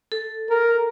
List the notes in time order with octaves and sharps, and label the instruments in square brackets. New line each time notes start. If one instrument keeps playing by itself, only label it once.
[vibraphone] A4
[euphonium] A#4